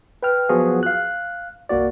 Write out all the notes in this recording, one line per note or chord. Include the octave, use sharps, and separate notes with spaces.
B4 G5 F6
F3 F#3 B3 F4 F#4 G#4
F5 F#6
G1 C2 A#3 F#4 D5